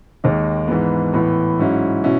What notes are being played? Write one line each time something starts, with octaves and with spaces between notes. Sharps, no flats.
D#2 D#3 G#3
G#2 E3 B3
A2 E3 B3
G#2 F#3 C#4 E4
B2 C#4 E4